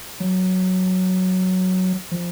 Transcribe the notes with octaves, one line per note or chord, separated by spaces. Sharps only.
F#3
F3